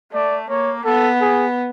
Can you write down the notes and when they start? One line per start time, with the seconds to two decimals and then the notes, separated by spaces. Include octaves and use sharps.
0.13 A3 D5
0.49 A#3 C#5
0.85 B3 A4
1.21 G#4